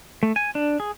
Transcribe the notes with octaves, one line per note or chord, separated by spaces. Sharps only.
A3
G#5
D4
G#4